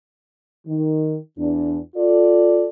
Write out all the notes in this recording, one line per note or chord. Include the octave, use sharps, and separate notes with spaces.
D#3
E2 D4
F4 A4 D5